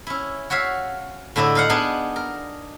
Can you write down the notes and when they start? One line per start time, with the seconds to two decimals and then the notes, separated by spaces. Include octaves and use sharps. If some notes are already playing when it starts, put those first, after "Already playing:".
0.07 C#4 E4
0.50 F#4 C#5 E5 F5
1.36 A2 D3 E4 D5 D#5
1.55 D#4 F5 F#5
1.69 B3 D4 D#4 G#4
2.16 A#4